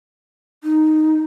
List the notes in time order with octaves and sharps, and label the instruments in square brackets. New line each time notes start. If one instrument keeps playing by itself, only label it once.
[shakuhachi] D#4